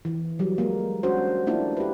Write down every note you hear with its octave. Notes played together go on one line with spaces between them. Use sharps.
E3
F#3 G3
G#3 A#3
C#4 D4 F#4 C5
A3 A#3 D4 E4 F4
G4 B4